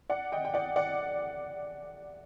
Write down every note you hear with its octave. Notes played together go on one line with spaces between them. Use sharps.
D5 F#5
D#5 G5
G5
D5 F#5
D5 F#5